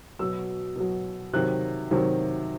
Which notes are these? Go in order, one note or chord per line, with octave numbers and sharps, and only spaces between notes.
B2 F#3 E6
B2 F#3
C3 D#3 F#3 F#6
C3 D#3 F#3